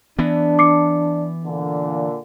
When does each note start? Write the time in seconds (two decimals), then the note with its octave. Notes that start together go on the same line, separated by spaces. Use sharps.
0.19 E3 B3 D4
0.59 D6 C7 C#7
1.45 A#2 D3